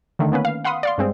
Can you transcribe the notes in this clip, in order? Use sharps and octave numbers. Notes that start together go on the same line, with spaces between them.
D3 D#3 A3
A#3 B3 C#4 B4
F5
F5 F#5 B5 C6 D#6
D5 F5 C6
G2 G#3 C4